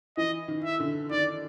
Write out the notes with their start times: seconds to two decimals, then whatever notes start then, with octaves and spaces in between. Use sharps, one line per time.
0.17 E3 D#5
0.48 D#3
0.64 E5
0.80 D3
1.11 D#3 D5